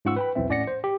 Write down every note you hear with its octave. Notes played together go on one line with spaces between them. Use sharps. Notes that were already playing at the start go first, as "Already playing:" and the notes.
G#2 C#4 F4 F#5 C#6 E6
B4 G5 B5
B1 E2 E3 C4 E5
A2 C#4 D5 F#5 A#6 C#7
C5
G4